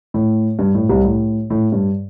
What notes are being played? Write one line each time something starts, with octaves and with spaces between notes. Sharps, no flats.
A2
G2
A2
C2 C3
A2
A2
G2